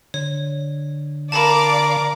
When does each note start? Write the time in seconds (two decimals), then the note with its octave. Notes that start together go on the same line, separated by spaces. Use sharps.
0.14 D3 C#5
1.32 A#4 D5 F5 A5 B5 D6